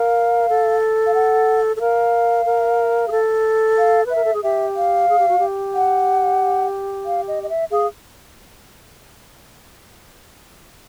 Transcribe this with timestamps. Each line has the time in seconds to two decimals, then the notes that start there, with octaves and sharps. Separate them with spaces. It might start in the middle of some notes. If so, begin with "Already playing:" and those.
Already playing: A#4 F5
0.49 A4
1.06 F5
1.14 F#5
1.76 A4
1.80 A#4 F5
2.46 A#4
3.08 G#4
3.11 A4
3.78 F5
4.06 B4 E5
4.16 A#4
4.25 A4
4.34 G#4
4.43 G4 E5
4.76 F5
5.09 G#4
5.19 G4
5.29 F#4
5.39 G4
5.75 F#5
7.06 F5
7.28 D#5
7.43 D#5
7.49 E5
7.71 G#4 F5